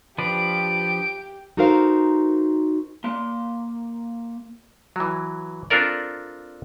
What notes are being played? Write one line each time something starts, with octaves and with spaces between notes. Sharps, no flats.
F3 D4 G4 B4 D7
D#4 F#4 A4 A#4 C5 F5
A#3 C6
E3 F#3
C4 D4 F4 A4 A#4 D5